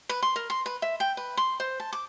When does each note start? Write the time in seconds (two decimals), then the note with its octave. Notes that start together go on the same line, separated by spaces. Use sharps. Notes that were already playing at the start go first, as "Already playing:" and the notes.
0.09 B4
0.22 C6
0.36 A#4
0.50 C6
0.66 B4
0.82 E5
1.00 G5
1.17 B4
1.37 C6
1.60 C5
1.80 A5
1.93 D6